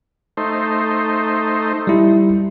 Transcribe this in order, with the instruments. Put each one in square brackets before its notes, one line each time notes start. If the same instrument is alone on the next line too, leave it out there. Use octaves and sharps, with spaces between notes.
[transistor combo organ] A3 D#4 C5
[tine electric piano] G3 E4